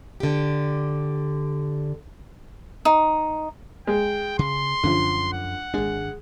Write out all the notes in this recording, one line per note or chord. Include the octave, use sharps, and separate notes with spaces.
D3 G4
D#4
G#3 G5
C#3 C6
F#2 D3 F3 C#4
F#5
G#1 G#3 D4